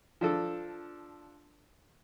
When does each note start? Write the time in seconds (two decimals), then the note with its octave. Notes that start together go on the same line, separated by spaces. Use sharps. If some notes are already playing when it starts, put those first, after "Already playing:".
0.21 F3 D4 A4